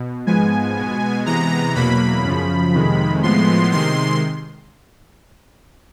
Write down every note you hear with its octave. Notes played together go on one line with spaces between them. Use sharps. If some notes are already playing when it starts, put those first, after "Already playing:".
Already playing: B2
G#2 F3 G#3 B3 G#5
B2 G#3 B3
C3 E3 G#3 B3 A#5
E2 B2 F#3 A#3 B5
F#2 C#3 F3
F2 C3 D#3 G#3
A2 F3 G#3 B3 C6
C3 D#3 G#3 C6